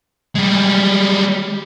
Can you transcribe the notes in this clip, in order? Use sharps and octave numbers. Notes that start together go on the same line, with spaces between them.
G3 G#3